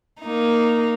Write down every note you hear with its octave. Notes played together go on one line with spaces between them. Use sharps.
A#3 D#4